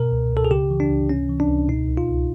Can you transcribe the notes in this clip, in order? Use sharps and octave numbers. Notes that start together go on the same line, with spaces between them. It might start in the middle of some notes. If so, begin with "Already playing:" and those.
Already playing: B2 A#4
C#2
C#2 A4
G#4
C#3 G4
E3
D4
C#2
C3 C#4
E3
D4
C#2
B2 D#4
C2
F4
C2